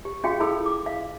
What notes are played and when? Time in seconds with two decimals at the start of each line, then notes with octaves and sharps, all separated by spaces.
0.05 G4
0.24 C#4 F4 F#4 G#4 F5 G5
0.40 E4 G#4 A4 F5 B5 E6
0.66 D6
0.86 F5